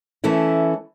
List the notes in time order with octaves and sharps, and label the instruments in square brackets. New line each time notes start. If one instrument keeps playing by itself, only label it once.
[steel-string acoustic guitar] E3 A3 C#4 E4